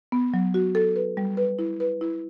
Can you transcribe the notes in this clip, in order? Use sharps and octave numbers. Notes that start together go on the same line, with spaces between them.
B3
F#3
F#4
A4
B4
G3
B4
E4
B4
E4